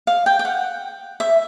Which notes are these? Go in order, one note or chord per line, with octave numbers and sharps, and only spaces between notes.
F5
G5
G5
F#5
E5